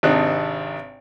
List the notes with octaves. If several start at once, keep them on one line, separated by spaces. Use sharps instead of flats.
G#1 C3 D4 D#4 F#6